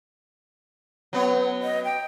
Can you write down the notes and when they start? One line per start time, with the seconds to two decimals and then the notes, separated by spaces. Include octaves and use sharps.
1.13 F#3 B3 C#5
1.63 D#5
1.84 G5